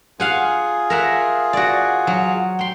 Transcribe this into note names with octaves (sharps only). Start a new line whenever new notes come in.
F4 G#4 F5 F#5 G#5
A#4 E5 F#5
F#4 D5
F#3
G5 C6